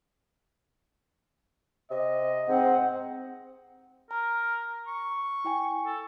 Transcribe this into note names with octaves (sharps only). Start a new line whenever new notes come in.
C3 D#5
G#2 C4 F#5
A#4 A#5
C#6
E4 G5 G#5
A4